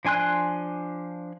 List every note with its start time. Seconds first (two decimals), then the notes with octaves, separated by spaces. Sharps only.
0.05 F3 D4 G#5 C6 F#6